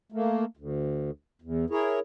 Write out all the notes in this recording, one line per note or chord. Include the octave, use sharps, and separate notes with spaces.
A3 A#3
D2
E2
E4 G#4 A#4 C#5